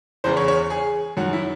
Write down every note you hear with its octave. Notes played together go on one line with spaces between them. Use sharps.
E2 C#3 E3 C5
C#5
C#5
G#4
F#2 D#3 F#3 F#4
E4